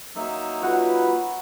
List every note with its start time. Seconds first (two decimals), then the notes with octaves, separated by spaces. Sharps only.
0.16 F#3 A#3 D#4 E5
0.62 F4 F#4 B4 C#5 F#5 A#5